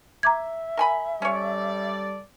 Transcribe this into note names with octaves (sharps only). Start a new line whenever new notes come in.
E5 A#5 D6 G#6
A#4 G#5 B5
G3 C#4 A4 C#5 D5